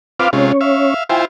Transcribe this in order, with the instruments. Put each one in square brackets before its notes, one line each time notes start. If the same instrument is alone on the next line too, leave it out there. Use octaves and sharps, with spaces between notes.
[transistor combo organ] C4 F4 B4 [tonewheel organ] F5 D6 F6
[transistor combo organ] C3 G#3 F4 [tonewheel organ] C#4 C#5
[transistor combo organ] E5 F5
[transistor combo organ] E4 F4 C5 [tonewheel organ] G5 G#5